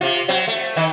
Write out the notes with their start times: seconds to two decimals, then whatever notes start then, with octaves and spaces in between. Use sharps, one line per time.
0.01 C3 F4
0.28 F#3 C4
0.48 A3
0.76 D#3